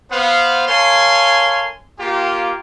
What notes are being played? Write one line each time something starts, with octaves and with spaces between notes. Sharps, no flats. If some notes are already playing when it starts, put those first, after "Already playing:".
B3 C5 F5
A4 A#4 C#5 F5 G#5 C6
A#3 F4 G4